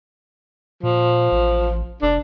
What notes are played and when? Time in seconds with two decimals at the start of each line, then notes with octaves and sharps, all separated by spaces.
0.83 A#2 F3
1.32 A1
2.02 F1 D4